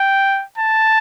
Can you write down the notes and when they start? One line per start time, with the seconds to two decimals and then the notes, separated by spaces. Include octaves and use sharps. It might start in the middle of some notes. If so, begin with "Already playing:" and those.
Already playing: G5
0.58 A5